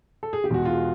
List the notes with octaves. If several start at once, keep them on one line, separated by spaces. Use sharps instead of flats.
A4
G#4
G4
E2 B2 G#3 F#4
F4